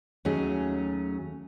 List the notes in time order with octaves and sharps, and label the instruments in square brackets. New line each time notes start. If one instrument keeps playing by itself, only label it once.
[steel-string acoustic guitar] D#2 F#3 A3 C#4 G#4